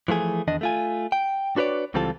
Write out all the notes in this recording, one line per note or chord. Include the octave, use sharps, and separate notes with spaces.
E3 F3 A3 G#4
E2 D#3 D4 D#5
A3 F4 G#5
G5
D4 F#4 B4 C#5 D5
C#2 E3 G3 C4 F4 A4